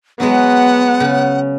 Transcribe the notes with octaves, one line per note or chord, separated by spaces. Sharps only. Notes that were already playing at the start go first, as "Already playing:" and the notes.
F#3 G#3 B3 F#5
C#3